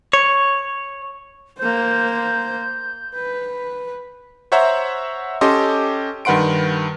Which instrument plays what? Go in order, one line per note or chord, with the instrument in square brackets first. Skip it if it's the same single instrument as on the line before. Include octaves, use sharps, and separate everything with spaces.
[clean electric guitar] C#5
[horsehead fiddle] A#3 C5 [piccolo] G6
[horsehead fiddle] B4
[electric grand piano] C5 C#5 E5 F#5 A#5 E6
C#4 G4 A4 D#5 C6
G2 D#3 B4 F#5 C6 D7